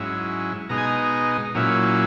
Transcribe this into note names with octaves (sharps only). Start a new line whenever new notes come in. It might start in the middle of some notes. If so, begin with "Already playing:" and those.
Already playing: G#2 F#3 C#4 E4
B2 G#3 D#4 A#5
G#5
A#5
A#2 F#3 C#4 E4